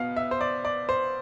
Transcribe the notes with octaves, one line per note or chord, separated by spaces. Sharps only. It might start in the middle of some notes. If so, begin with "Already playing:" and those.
Already playing: B2 B3 F5
E5
C5
D5
D5
C5